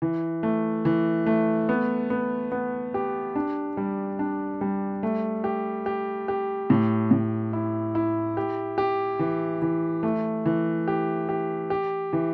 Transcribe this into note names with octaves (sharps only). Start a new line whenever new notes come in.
E3
A3
E3
A3
B3
B3
B3
G4
D4
G3
D4
G3
A3
G4
G4
G4
A2
A2
E4
E4
G4
G4
E3
E3
A3
E3
G4
G4
G4
E3